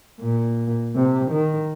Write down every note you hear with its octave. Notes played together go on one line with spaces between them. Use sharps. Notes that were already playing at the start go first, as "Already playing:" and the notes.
A#2
C3
D#3